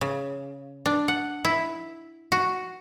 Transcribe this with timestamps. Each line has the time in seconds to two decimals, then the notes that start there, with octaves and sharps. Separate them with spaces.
0.01 C#3
0.86 D4
1.08 F#5
1.45 E4
2.32 F#4